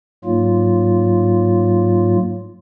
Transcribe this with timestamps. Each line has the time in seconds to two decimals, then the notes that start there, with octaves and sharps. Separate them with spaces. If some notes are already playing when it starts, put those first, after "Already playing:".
0.25 G#2 F#3 A#3 F4